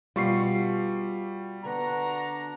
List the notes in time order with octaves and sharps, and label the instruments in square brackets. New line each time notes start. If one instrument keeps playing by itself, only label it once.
[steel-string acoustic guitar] B2 F4 [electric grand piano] G3 C#6 C7
[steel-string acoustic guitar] D3 B3 [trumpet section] D4 F#4 A#5